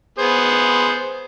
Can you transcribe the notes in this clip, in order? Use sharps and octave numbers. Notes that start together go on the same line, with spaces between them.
B3 G#4 C5